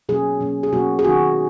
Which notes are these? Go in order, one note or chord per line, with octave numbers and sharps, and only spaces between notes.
B2 F#3 A#3 C#4 G#4
B2 F#3 A#3 C#4
G#4
B2 F#3 A#3 C#4 F#4
G#4
D#3 A#3 D#4 F#4